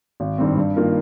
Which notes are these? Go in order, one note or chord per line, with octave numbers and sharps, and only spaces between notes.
G#1
G2 D#3 G3 C4
G2
D#3 A#3 F4 A#4